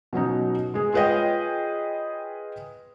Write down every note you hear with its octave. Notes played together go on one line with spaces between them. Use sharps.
B2 F#3 C#4 D#4
G#3 G#4
F4 G#4 B4 C#5 D#5 G5